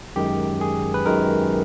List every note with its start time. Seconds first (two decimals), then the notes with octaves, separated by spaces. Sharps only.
0.16 F#2 D#3 G#3 G4
0.61 G#4
0.94 B4
1.06 F#2 D#3 G#3 A#4